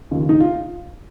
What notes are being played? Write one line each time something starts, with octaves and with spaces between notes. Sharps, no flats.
D#2 C#3 F3
A#1 D#4
F4